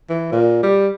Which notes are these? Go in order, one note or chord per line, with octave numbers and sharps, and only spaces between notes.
E3
A#2
G3